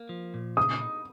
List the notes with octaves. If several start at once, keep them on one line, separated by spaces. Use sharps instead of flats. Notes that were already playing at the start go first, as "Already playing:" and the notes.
Already playing: A#3
F3
A#2
C#3 D#6
D#4